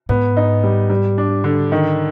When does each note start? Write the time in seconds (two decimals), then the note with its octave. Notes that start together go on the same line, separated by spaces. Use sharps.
0.09 G#2 B3
0.37 D#4
0.64 G3
0.90 G3
1.18 D4
1.44 D3
1.72 D#3